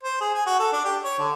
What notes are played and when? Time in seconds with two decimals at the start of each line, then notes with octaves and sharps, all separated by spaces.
0.03 C5
0.21 G#4
0.34 G#5
0.46 F#4
0.59 A4
0.72 D4
0.84 G4
1.04 C#5
1.19 D3